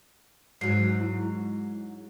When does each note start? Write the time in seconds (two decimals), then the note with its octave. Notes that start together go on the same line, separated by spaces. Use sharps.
0.61 G#2 F#3 C7
1.01 E4